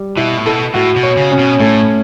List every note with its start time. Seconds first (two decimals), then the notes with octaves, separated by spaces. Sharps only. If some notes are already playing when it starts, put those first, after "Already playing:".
Already playing: G3
0.17 B2 E4
0.38 A2
0.46 B2 A4
0.74 A2 F#4
0.96 B2
1.03 C#5
1.17 C#3
1.32 C#4
1.39 B2
1.60 A2 A3